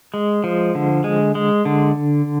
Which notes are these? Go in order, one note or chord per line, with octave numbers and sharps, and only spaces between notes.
G#3
F3
D3
G#3
G#3
D3